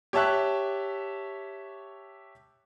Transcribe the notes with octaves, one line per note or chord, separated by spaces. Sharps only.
G4 C#5 E5 A5 C#6 F#6